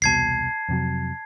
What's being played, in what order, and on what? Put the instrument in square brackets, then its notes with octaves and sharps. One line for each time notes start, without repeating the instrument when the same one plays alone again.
[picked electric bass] E1 C2 B2 [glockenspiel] A5 G#6 C7
[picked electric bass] F2 C3 F#3